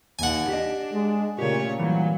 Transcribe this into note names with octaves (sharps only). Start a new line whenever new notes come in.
D#2 F#5 G#5
D4 G4 D#5
G#3
A#2 C#3 A3 C#4 G4 C#5
E3 F#3 G3